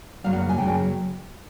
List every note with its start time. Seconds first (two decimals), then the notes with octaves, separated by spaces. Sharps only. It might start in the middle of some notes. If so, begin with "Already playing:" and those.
0.24 F#2 C#3 F#3 A#3 F5
0.33 F#5
0.49 G#5
0.58 F#2 C#3 F#3 A#3 G5